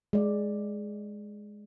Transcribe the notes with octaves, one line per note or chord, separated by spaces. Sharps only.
G#3 D5